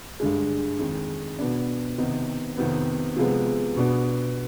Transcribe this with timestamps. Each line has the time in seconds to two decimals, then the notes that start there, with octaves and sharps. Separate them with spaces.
0.20 G2 D3 G#3
0.79 F2 D#3 G#3
1.39 B2 B3 D4
1.98 C3 D#3 B3 D#4
2.57 F2 C3 D#3 B3
3.16 C3 F3 G#3 B3
3.76 B2 B3 D4